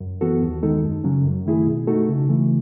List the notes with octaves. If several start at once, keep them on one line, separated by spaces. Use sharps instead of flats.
F#2
E3 B3 F#4 A4
D#2
D#3 G#3 D#4 A4
F#2
C#3 F#3 C#4
F#2
D#3 A3 E4 G#4
B2
A3 D#4 F#4 A4
C#3
E3 A3